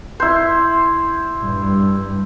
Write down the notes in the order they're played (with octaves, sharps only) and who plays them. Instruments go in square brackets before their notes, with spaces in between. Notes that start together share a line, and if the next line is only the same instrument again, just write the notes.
[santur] E4 C5
[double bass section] G2